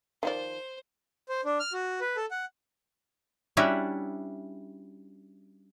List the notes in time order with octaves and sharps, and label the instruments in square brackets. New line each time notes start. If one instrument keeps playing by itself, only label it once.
[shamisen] D#3 F3 D5 [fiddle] C5
[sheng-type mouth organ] C5
D4
F6
F#4
B4
A4
F#5
[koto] G3 C#4 D4 E4 F#4 E5